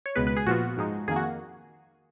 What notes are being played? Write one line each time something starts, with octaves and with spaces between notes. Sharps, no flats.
C#5
C#2 B2 G#3 B3 B4
B4
G#4
A#2 F3 B3 F4 F#4
G#2 F3 G#3 D#4
F2 D#3 A#3 G#4
F#4